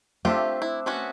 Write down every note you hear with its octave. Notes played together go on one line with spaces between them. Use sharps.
A3 C4 D4 F4 G4 E5
E4
B3 C#4 F#4